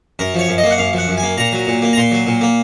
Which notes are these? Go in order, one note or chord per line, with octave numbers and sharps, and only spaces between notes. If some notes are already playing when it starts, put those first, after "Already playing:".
F#2 A#4
F3 C#5
F#2
D#5
A#3
F#5
F#2 F5
F3 F#5
F#2
G#5
A#3
A#2 A#5
F#3
A#2
A#3
A#5
A#2 C6
F#3
A#2
A#3